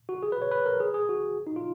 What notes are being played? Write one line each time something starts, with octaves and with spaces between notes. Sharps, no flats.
F#4
G#4
B4
C#5
B4
A#4
G#4
G#4
F#4
D#4
F4